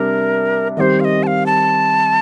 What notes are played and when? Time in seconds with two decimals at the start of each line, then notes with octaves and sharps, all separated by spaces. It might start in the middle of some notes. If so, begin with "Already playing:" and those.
Already playing: C3 G3 D4 A#4
0.77 D#3 G3 C4 G4 C5 D#5
1.00 F5
1.05 D#5
1.23 A5
1.27 F5
1.46 A5